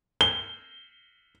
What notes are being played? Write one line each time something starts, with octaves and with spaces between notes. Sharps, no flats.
G7